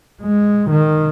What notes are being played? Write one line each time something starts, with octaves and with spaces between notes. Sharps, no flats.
G#3
D#3